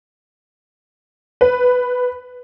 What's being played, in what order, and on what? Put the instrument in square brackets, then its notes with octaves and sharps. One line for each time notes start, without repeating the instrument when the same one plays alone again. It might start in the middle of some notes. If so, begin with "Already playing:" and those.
[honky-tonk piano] B4